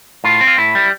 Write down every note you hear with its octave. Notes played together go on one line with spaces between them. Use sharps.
A2 F4
C4
F4
A2 E4
G3